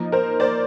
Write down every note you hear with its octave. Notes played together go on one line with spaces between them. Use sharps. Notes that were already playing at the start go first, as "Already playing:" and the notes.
Already playing: F3 A#3 D#4
A#4 C5
C5 D5